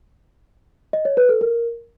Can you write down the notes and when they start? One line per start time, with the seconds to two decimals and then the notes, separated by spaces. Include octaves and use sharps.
0.93 D#5
1.05 C#5
1.17 B4
1.29 A4
1.41 A#4